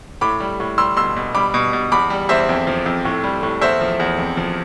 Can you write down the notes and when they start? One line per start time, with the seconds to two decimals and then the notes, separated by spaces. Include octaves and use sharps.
0.21 A2 B5 D6
0.40 G3
0.60 A2
0.78 G3 C6 E6
0.97 B2 C6 E6
1.16 B2
1.35 G3 B5 D6
1.54 B2
1.73 B2
1.92 E2 B5 D6
2.10 G3
2.29 E2 C5 E5
2.49 F2
2.67 F3
2.86 F2
3.05 A2
3.24 G3
3.43 A2
3.61 E2 C5 E5
3.81 F3
4.00 E2
4.19 F2
4.37 F3